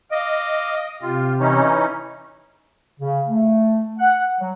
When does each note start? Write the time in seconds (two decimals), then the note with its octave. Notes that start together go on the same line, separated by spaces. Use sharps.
0.11 D#5 F5 D6
1.02 C3 F4 G4
1.40 E3 C#4 D#4
3.00 C#3
3.27 A3
3.99 F#5
4.40 F#3